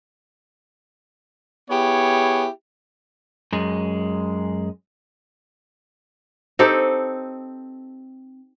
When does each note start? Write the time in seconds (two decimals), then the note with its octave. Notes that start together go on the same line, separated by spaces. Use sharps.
1.70 B3 E4 G4 G#4 C#5
3.52 F#2 G#3
6.59 C4 D#4 G4 A4